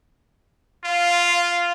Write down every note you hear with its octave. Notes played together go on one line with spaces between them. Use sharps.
F4 F5